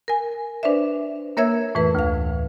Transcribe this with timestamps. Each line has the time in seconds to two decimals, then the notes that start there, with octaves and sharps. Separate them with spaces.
0.08 A#4 G#5
0.63 D4 B4 C5 D5 E5
1.37 A#3 A#4 C#5 E5 E6 G#6
1.75 F2 A2 E3 A3 B4
1.95 D2 F5